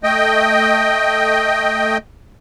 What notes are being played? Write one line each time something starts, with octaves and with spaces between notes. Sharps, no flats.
A3 D#5 G5